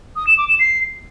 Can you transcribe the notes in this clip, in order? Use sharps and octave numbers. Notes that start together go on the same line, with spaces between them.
D#6
E7
D6
E7
C7